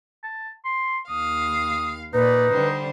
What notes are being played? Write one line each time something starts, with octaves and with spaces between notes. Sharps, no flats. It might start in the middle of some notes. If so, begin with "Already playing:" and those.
A5
C6
D#2 F5 D#6
A#2 D#4 B4 D5
D3 G3 C5